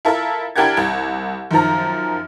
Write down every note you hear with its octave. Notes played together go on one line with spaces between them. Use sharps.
E4 F4 A4 A#4 E5
D4 E4 G4 A#4 F#5 G#6
C2
F#2 D#3 F3 A#5